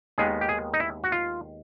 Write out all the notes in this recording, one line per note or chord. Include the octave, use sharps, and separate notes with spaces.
D#2 D#3 G#3 B3 G#4
G4
G#4
D#4
E4
F#4
F4